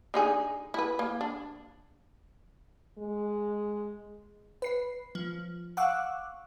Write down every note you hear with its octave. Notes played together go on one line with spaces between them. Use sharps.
D3 D#4 G#4
E4 B4
A#3
D4
G#3
B4 C7
F3
F5 F#5 C#6 D6 E6 F#6